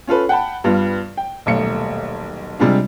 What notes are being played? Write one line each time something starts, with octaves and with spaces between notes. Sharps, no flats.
C#4 F4 A4 B4
F#5 G5 A5 B5
G2 G3 B3 F4
G5
D#1 B1 A3 C#7
C3 G3 G#3 D4 F4